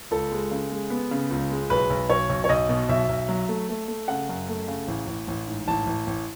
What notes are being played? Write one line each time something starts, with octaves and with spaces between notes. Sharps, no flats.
C#2 A4
G#3
C#3
G#3
B3
C#3
C#2
G#3
B1 B4
B1
B1 C#5
B1
C#5
B1 D#5
B2
B1 E5
B1
F#3
A3
A3
A3
C#3 F#5
F#2
A3
C#3
A1
A1
A1
G#2
A1 A5
A1
A1